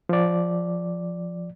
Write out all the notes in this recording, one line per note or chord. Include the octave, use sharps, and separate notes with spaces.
F3 D5